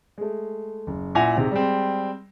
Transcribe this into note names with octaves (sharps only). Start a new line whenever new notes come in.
G#3 A3
F#1
A#2 E4 F#5 G#5 A#6 F7
G#2 C3 G#3
G3 G#3 C4